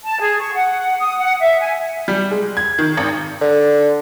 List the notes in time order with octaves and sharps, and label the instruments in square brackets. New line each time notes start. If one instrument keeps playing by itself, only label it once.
[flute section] A5
G#4
C#6
F#5
D#6
F#5
E5
G#5
[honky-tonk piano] G3
G#3
G#6
D#3
G#1
[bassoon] D3